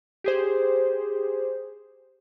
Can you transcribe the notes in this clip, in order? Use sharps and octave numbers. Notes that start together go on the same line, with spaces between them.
G4 G#4 C5